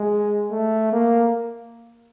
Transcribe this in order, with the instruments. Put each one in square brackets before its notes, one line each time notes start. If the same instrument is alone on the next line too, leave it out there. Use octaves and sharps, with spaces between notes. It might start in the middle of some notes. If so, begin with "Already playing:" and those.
Already playing: [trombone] G#3
A3
A#3